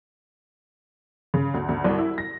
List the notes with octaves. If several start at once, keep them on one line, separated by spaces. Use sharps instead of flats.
C#3
D2
D2
C2
E4
A#6